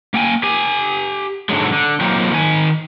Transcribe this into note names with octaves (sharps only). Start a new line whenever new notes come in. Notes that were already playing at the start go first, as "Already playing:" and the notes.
A#3 G5 G#5
G4 G#5
G#2 D3 E3 F#3 G#3
D3
F#3 A#3 C4 D#4 F4 G4
D#3 G#5